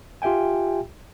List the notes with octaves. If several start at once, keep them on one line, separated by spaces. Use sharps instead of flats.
F4 G4 E5 G5 G#5